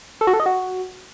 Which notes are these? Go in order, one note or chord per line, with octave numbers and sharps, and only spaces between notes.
A4
F#4
A4
D#5
F#4